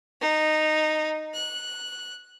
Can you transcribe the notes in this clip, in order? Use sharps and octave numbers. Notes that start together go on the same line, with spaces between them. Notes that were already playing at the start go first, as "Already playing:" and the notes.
D#4
F#6